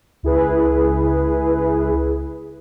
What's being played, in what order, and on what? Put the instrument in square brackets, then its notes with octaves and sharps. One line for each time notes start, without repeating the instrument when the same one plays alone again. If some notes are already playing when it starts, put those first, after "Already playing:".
[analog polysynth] C#2 E4 G#4 B4